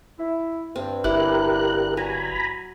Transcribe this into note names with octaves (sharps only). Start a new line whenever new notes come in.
E4
G2 C4
G1 E4 G4 A#4 F#6
F#3 G#5 A#5 B5